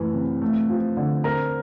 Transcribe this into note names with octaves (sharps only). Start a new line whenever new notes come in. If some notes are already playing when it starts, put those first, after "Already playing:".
Already playing: F#2 E3 A3 B4
C3
A3
F3
D3
C4 A#4 A#5